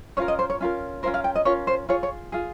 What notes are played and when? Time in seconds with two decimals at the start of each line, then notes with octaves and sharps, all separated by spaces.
0.17 C#4 F4 A#4 C#5
0.28 D#5
0.39 C5
0.50 C#5
0.61 C#4 F4 A#4
1.03 C#4 F4 A#4 C5
1.14 F5
1.24 G5
1.36 D#5
1.45 C#4 F4 A#4 C#5
1.67 C5
1.89 F4 G#4 C#5
2.03 C#5
2.32 F4 G#4